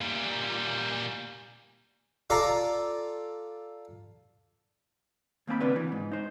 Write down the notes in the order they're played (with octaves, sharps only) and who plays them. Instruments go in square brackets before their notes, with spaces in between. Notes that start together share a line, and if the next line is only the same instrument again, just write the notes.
[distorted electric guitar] A#2 G3
[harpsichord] F4 A4 D5 A#5
[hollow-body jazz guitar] D#2 A#3 C4 G#5 B5
C#3 B3 C4 D4 B4
E3
G#2
D#4 C5